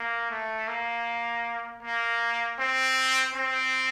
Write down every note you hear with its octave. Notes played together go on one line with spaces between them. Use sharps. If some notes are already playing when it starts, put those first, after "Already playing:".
Already playing: A#3
A3
A#3
A#3
C4
C4